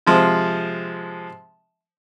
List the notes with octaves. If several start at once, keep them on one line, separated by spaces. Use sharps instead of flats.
C3 F3 G#3